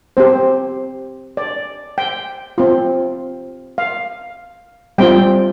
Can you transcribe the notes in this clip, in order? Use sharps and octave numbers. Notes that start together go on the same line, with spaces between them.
C4 G4 C5
D5
G5
C4 F4
F5
G3 C4 F4 G5